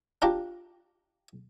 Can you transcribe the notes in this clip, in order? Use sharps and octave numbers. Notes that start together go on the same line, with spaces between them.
D4 F4 G4 A#5